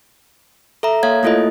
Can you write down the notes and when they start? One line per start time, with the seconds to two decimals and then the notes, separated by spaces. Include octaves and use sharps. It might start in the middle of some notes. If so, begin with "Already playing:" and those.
0.83 A4 E5 A#5
1.03 A#3 C#5 F5 G#6
1.23 A3 A#3 E4 F4 A4 D#5